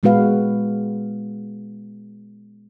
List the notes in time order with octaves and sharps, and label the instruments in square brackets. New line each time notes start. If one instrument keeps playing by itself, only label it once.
[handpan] A#2 G#3 B3 F#4 B4 F5